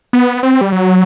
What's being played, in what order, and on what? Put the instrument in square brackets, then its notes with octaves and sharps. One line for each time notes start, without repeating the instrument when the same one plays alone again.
[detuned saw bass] B3
C4
G3
F#3